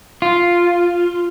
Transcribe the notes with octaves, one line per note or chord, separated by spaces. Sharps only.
F4